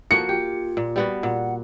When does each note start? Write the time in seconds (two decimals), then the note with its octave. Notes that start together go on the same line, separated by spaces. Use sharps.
0.11 F3 A#3 F#4 C#7
0.29 F4 G4
0.77 A#2
0.96 G3 B3 F#4
1.23 A#2 F#5